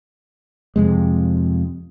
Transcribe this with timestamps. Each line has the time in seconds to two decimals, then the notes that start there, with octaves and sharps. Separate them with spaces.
0.76 F2 C3 G#3